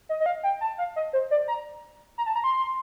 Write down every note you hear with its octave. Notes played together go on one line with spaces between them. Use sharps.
D#5
D#5
F5
G5
A5
F5
D#5
C5
D5
A#5
A#5
A5
A#5
C6